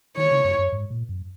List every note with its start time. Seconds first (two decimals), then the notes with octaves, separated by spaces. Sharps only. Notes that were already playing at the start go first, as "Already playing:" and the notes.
0.17 D#3 C#5
0.31 C#3
0.44 F#2
0.59 F#2
0.72 G#2
0.90 A#2
1.09 F#2